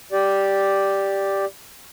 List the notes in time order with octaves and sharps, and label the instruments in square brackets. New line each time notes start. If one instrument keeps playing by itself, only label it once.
[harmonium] G4 D5